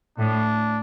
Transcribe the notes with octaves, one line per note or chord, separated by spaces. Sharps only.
A2 D4